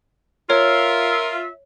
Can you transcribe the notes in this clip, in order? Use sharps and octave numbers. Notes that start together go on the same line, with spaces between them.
F4 A#4 C#5 E5